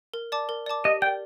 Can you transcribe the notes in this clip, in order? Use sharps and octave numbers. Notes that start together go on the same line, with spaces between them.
A#4
D5 A5 D6
A#4
D5 A5 D6
G4 D#5
A#4 D5 G5